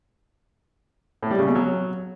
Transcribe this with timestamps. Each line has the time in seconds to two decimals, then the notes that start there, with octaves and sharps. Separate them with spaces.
1.23 A2
1.31 G3
1.39 C#3
1.47 B2
1.55 F#3